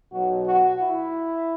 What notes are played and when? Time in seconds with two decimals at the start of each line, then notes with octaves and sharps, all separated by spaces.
0.13 B1 B2 F#3 F#4
0.47 F#4
0.81 E4